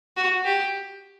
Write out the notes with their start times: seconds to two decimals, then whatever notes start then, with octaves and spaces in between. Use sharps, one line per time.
0.17 F#4
0.45 G4